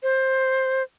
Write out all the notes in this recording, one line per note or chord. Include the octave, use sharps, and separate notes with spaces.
C5